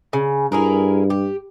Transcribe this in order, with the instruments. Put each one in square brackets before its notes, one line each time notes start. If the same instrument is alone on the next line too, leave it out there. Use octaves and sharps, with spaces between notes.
[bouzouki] C#3
[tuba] G2 [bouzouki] E4 G#4 A#4
[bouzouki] G4